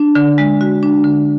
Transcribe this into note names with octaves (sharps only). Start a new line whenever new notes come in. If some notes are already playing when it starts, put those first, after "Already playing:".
Already playing: D4
D3
G#3
F#4
D4
D3